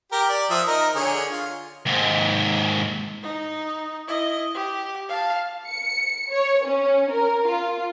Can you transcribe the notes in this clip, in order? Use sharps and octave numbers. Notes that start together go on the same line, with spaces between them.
G4 A#4
D5
F3 E5 D#6
D#4 A#4
D3 G#4 C#5
F4
D#2 G#2
D#4
E4 D#5
G4
F5 A5
C#7
C#5
C#4
A#4
F4